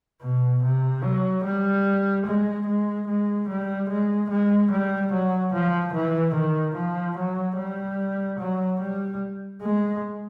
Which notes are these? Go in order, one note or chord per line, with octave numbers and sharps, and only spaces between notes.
B2
C3
F#3
G3
G#3
G#3
G#3
G3
G#3
G#3
G3
F#3
F3
E3
D#3
F3
F#3
G3
F#3
G3
G#3